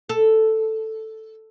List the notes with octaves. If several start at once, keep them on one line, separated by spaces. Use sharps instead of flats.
A4